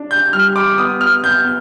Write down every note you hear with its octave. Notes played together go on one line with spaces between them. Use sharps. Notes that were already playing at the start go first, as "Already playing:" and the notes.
Already playing: D4
G6
G3 F6
D6
B3 D#6
F6
B3 G6